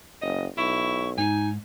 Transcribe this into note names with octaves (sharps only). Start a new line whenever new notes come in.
F#1 D#5
B1 E4 C#6
G#2 D#4 G#5